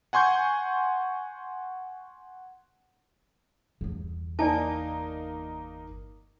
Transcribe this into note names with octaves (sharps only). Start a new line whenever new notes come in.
F#5 G#5 C6 C#6 G6
G1 E2
A#3 D#4 D5 G#5 A5